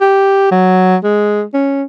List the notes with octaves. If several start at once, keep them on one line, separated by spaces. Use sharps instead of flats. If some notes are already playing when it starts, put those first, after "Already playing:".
G4
F#3
G#3
C#4